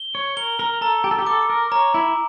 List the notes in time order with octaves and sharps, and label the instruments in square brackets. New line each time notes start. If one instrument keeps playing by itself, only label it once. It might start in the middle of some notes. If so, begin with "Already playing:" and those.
Already playing: [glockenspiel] G7
[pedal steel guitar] C#5
[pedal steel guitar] A#4 [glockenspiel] G7
[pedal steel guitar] A#4
[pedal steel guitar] A4 [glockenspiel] A#5
[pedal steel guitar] G4
A4
G4
[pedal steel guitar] A4 [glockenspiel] D6
[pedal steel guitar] A#4
[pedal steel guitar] C#5 [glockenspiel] A#5
[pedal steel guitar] E4